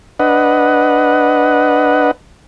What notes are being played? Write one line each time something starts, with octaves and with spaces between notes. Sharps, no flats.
D4 B4 D#5 F#5